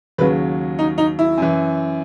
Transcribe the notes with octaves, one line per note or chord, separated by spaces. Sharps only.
D#2 C#3 F#3 B4
D#4
D#4
E4
F#2 E3